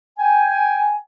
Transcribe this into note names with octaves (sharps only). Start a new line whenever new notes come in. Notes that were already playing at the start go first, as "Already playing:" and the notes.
G5 G#5